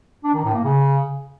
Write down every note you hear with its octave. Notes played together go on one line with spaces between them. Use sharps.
D4
D#3
A2
A#3
C#3